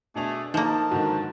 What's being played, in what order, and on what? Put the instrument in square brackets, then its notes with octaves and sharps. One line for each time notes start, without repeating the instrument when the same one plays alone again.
[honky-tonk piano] B2 D4 F7 [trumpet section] A3 G#4
[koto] F3 A#3 [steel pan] D#4 [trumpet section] A#4 C5 A5
[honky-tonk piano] G#2 D3 D#3 [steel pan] F#4